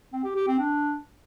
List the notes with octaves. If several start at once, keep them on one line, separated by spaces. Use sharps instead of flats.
C4
G4
G4
C4
D4